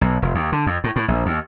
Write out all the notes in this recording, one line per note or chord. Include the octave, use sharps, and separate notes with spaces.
B1
F1
D#2
D3
F2
A2
A2
A#1
D#2